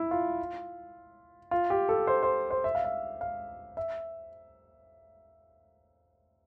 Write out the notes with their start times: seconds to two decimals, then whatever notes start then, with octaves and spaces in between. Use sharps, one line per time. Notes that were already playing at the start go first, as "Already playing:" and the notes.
Already playing: E4
0.11 F4
1.51 F4
1.70 G4
1.89 A4
2.07 C5
2.23 C5
2.51 C5
2.64 E5
2.75 F5
2.84 E5
3.21 F5
3.77 E5